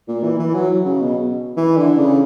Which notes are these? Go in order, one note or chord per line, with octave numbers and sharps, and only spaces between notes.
A#2
E3
E3
F#3
C#3
B2
E3
D3
C#3